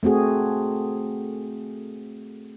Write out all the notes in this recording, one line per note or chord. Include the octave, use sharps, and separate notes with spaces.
A3 C4 F#4 G#4